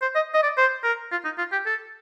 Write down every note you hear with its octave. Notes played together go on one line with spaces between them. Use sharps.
C5
D#5
D#5
D5
C5
A#4
F4
D#4
F4
G4
A4